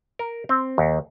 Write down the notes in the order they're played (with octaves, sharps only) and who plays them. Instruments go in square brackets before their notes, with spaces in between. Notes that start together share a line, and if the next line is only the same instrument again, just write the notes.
[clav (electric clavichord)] A#4
C4
D#2